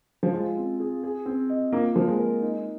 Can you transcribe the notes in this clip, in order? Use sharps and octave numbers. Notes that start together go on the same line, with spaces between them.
F3
G#3 F4
C4
G#4
G#4
C4
D#5
A#3 F4
F3 A#3
G#3
A#4
D#4